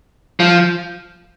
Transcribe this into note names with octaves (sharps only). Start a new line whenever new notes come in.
F3